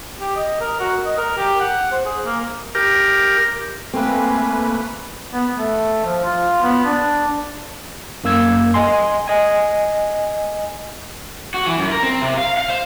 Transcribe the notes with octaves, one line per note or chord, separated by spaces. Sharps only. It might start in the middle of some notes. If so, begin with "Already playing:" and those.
G4
D#5
A#4
F#4
D#5
A#4
G4
F#5
C5
G#4
A#3
G4 A#4
A3 A#3 C4 B4 G#5
B3
A3
F3
F4
B3
D4
F#2 A#3 E6 G#6
D#5 G#5 C6
D#5 G#5
F#4
E3
F#2
A#4
C4
C3
F5
F5
C5